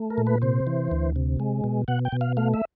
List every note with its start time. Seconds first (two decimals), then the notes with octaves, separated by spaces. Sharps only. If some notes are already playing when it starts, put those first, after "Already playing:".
Already playing: A3
0.10 A#4
0.18 A#2
0.27 B4
0.42 C3 C5
0.67 E3
0.91 D2
1.16 C3
1.40 G#3
1.64 B2
1.88 B2 F#5
2.05 G5
2.12 B2
2.21 F5
2.37 A3 F5
2.54 E5